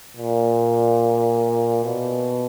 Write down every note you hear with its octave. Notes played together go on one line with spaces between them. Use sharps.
A#2
B2